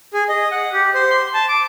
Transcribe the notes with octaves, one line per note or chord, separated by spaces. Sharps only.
G#4
D#5
F#5
G4
C5
C6
A5
D6